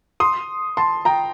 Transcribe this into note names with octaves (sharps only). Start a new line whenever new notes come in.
C6 D#6
A5 C6
G5 A#5